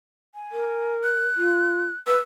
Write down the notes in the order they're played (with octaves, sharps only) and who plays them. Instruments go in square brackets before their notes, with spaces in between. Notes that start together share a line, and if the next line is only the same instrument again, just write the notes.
[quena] G#5
[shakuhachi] A#4
[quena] F#6
[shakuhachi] F4
[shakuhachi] B4 [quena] E6